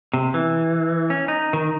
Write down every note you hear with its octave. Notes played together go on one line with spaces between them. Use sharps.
C3
E3
C#4
D#4
D#3